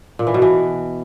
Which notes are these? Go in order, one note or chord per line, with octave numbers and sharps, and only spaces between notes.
A#2
E3
B2
E3